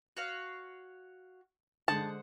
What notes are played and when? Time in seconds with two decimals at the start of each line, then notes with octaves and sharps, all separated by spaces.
0.17 F#4 C#5 F5
1.88 D3 G#3 C5 F#5 A5 D#6